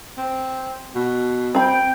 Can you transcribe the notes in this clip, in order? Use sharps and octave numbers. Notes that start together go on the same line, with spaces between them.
C4
B2
C4 G5 B5